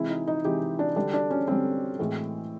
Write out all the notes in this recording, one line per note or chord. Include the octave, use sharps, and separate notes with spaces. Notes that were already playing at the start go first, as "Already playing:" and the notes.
Already playing: C3 E3 G#3 E4
D#4
D#4
C3 E3 G#3 G4
D4
D3 G3 D4
D4
C#4
D3 G3 C4
A2 E3 G#3